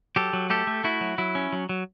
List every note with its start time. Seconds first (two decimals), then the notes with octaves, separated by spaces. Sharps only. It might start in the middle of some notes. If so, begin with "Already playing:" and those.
0.16 F#3 G4 A4
0.33 F#3
0.50 A3 G4 A4
0.67 A3
0.84 A3 E4 F#4
1.01 F#3
1.18 F#3 E4
1.35 C#4
1.53 F#3
1.69 F#3